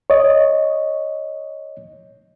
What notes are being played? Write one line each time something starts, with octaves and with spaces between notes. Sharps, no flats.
C#5 D#5